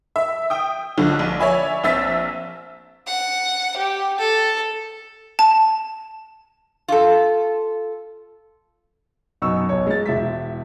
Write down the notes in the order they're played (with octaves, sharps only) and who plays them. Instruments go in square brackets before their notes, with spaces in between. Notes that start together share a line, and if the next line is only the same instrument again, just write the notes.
[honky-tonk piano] E5
G5 D#6
B1 D3 F3
A#1
C#5 D5 E5 G#5 B5
A#1 C4 E5 E6 A6 B6
[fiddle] F#5
G4
A4
[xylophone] A5
[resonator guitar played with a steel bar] F4 A4
[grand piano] F#2 B2 B3 D#4 C#6 E6
B1 C#5
G#3 A6
E1 E5 B6